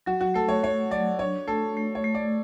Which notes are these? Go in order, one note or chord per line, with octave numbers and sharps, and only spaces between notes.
F#3 F#4
F#4
A3 A4
C#5
A3 C#5
F#3 D5
D4 C#5
A3 A4
A3
C#5
A3
D5